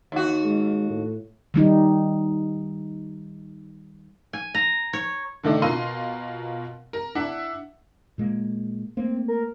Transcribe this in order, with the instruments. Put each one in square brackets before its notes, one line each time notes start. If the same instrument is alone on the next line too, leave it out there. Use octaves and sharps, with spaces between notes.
[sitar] D#2 F#4
[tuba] G#3
A2
[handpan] D#3 G3 D#4
[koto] G#5
A#5
C#5
[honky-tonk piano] D3 D#3 A3 D4
B2 F4 A#4 C6 D#7
A#4
D4 E4 E5 F#5
[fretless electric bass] A#2 G#3 A#3
[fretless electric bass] A3 A#3 [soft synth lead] C4
[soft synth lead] A#4